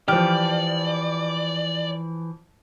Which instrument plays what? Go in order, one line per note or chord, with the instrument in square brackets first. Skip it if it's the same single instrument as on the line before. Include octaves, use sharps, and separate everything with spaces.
[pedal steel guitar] E3 [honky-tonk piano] F3 F6 [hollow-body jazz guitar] G4 [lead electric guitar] D5